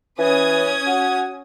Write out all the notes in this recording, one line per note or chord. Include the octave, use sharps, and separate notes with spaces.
E3 C#4 D#6 G#6
F#4